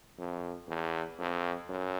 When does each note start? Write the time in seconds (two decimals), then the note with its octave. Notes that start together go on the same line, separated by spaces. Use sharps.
0.18 F2
0.68 E2
1.19 F2
1.70 F#2